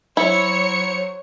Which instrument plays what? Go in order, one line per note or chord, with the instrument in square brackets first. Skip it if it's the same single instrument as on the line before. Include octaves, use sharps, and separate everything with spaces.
[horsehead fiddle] F#3 C5 [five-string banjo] E4 [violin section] C#5 C#7